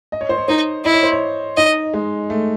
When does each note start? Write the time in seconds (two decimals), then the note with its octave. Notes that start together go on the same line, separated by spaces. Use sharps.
0.12 D#5
0.21 C#5
0.29 C5
0.38 C#5
0.48 D#4 C5
0.85 E4 D#5
0.94 C#5
1.03 C5
1.12 C#5
1.57 D#4 D#5
1.94 G#3
2.30 A3